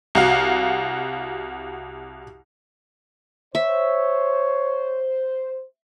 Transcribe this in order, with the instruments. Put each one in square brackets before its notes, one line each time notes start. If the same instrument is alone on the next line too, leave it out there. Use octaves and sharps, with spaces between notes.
[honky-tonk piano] C2 F#4 F5
[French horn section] C5 [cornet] C#5 [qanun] E5